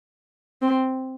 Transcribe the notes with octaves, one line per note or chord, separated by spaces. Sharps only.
C4